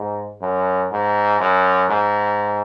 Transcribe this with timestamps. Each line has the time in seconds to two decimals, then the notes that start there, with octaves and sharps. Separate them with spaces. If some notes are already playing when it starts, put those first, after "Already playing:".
Already playing: G#2
0.41 F#2
0.91 G#2
1.40 F#2
1.89 G#2